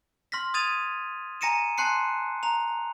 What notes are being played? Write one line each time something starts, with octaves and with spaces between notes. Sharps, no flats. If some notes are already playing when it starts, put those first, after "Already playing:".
C6 F6 A#6 B6
D#6 G#6 A6 D#7 F7
G#5 A#5 A#6 C#7 D#7 E7
G#5 A5 C6 F#6 C7 C#7
A#5 F7